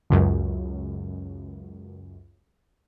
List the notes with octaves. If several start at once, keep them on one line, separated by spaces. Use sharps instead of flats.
C#2 F#2